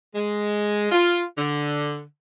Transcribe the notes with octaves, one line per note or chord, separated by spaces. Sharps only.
G#3
F4
D3